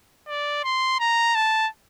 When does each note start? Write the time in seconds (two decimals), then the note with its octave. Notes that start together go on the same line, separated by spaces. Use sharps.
0.28 D5
0.64 C6
1.00 A#5
1.35 A5